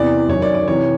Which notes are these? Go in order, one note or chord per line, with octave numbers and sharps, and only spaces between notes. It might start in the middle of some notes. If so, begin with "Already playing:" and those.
Already playing: E2 C3 E3 D5
F#2 D#3 C#5
D5
D5
C3 E3 C#5